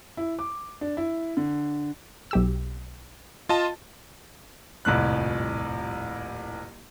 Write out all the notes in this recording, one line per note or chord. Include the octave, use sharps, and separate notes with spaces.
E4
D6
D4
E4
D3
B1 G4 E6
F4 D#5 A5
D#1 C2 F2 A2 F#6